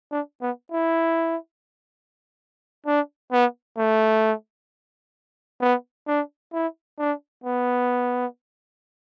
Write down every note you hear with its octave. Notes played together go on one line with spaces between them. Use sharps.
D4
B3
E4
D4
B3
A3
B3
D4
E4
D4
B3